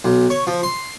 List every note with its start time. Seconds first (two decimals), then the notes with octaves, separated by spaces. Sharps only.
0.04 B1
0.30 C#5
0.47 F3
0.63 C6